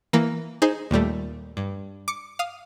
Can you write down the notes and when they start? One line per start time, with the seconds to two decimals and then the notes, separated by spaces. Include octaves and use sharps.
0.13 E3 A#3
0.62 D#4 G#4 C5
0.91 D#2 A#2 G3 A3
1.57 G2
2.08 D6 C#7
2.39 F5 D#6